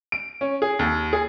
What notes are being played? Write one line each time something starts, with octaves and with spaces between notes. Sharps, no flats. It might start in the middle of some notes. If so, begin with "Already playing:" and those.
D7
C#4
G#4
D#2
G#4